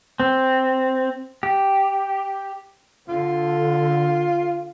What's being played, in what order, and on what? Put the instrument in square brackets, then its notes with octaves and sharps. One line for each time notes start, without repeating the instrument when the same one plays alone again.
[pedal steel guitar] C4
G4
[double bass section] D3 [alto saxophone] F4